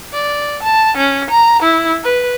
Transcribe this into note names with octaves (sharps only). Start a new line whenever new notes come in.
D5
A5
C#4
A#5
E4
B4